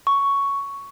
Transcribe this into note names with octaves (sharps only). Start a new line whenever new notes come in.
C#6